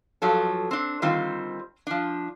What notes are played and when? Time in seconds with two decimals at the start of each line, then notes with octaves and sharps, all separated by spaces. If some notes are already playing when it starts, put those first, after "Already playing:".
0.22 G2 F3 F#3 A4
0.71 C4 D4
1.02 D3 D#3 G3 C4 F4
1.87 F3 D4